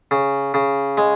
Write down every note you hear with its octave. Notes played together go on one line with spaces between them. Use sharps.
C#3
C#3
G#3